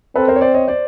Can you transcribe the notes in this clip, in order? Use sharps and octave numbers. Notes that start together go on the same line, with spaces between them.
C4 A4 B4
A#4 C5
C#5
C5 D5
C#5 D#5
C5 D5